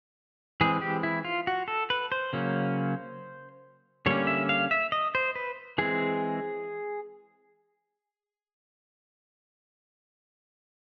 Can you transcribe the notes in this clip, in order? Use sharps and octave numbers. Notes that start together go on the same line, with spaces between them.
E3 G#3 C4 G#4
G4
E4
F4
F#4
A4
B4
C5
C#3 F#3 A#3 C#4
D3 G3 A#3 C#4 C#5
E5
F5
E5
D#5
C5
B4
E3 G#3 C4 G#4